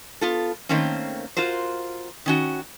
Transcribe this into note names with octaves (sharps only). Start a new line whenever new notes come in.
B3 F4 A4
D#3 A3 A#3 C4 C#4
F4 F#4 A#4 C5
D#3 C#4 F#4